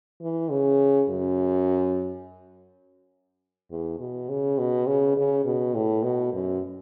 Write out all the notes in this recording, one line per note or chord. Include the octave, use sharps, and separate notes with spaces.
E3
C#3
F#2
E2
B2
C#3
B2
C#3
C#3
B2
A2
B2
F#2